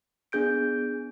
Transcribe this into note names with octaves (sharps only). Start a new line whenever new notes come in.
B3 D4 G#4 G6 D7